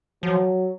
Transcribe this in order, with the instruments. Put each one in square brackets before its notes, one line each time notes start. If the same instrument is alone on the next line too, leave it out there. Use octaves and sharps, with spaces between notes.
[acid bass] F3 [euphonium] F#3